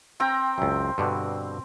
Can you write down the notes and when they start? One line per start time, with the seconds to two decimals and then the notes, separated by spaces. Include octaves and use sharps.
0.20 C4 G5 A#5
0.58 C#2 F#2
0.98 G2 B2 D3